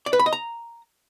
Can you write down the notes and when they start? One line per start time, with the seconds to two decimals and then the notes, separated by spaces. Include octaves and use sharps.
0.06 D5
0.13 B4
0.19 B5
0.26 D#5
0.33 A#5